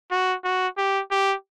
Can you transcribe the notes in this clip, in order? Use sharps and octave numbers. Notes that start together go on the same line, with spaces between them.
F#4
F#4
G4
G4